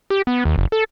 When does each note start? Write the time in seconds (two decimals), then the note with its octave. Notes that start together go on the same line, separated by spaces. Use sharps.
0.10 G4
0.27 B3
0.45 D#2
0.58 F#1
0.72 A4